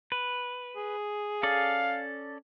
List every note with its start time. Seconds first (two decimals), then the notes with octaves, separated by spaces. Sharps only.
0.12 B4
0.76 G#4
1.43 C#4 A4 D5 F5